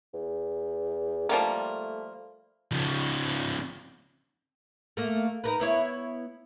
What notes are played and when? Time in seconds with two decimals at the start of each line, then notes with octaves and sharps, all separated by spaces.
0.14 E2
1.29 F3 G3 A3 A#3
2.71 C#3 F3
4.97 A3 A#3
5.44 D#4 A#4 B4
5.60 B3 E4 C#5